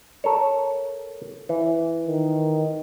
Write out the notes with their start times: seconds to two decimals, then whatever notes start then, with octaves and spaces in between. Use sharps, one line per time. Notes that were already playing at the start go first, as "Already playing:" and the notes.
0.24 A4 A#4 C#5
1.49 E3
2.07 D#3